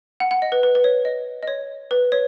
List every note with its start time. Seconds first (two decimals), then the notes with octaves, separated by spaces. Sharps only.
0.20 F#5
0.31 F#5
0.42 D#5
0.52 B4
0.63 B4
0.75 B4
0.84 C#5
1.05 D#5
1.43 D#5
1.47 C#5
1.91 B4
2.12 C#5